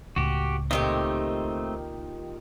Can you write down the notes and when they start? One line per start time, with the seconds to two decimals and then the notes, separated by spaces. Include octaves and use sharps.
0.16 C#2 A2 F#4 G4
0.71 A#2 D#3 A3 C4 D#4 G4